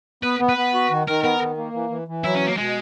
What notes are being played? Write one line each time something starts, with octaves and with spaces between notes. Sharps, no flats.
B3 B4
B3
B4
B3
F#4
D#3
D#3 A#4
B3 A#4
D#3
A#3
E3
E3
E3
F#3 E4
C#4
B2
A#3
B2 G#3